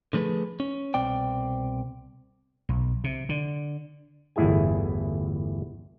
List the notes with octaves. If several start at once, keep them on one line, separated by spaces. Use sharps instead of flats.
D3 F3 A3 G#4 B4
C#4
C2 B2 C4 D5 G5
B1
C3
D3
G1 E2 A2 E4 G#4 G#5